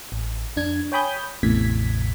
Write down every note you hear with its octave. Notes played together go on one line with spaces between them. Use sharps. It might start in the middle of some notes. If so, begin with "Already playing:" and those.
A1
F2 D4 G#6
C#5 G5 G#5 B5 D#6 G6
A1 E2 A2 C3 G#6 B6